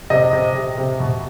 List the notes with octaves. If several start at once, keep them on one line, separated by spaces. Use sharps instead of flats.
C3 D#5
C3
C3
C3
B2